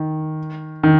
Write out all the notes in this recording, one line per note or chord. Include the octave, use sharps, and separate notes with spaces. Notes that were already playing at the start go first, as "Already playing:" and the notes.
Already playing: D#3
D#3